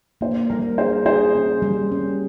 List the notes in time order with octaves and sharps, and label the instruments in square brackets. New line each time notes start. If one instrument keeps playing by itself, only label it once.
[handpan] A#3 [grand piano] C5
[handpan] G3 [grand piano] A#4
[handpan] G#4 [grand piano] C5
[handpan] G#4 [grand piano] C5
[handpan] C#4
G3
C#4